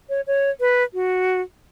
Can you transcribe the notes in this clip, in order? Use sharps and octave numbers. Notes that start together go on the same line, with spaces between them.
C#5
C#5
B4
F#4